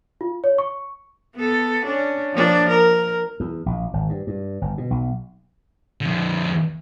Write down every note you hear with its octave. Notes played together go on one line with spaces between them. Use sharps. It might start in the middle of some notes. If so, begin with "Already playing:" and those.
F4
C#5
C#6
B3 A4
C#4 D4
F3 A#3 D4
A#4
E2
A#1
G#1
G2
G2
G1
B2
B1
F2 D3